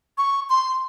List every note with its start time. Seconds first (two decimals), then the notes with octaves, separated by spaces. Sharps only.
0.18 C#6
0.50 C6